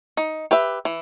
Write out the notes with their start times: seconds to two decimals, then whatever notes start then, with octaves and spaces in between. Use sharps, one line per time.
0.17 D#4
0.51 G4 B4 E5
0.85 E3